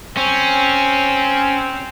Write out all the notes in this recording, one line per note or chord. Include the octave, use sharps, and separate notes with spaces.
C4 C#4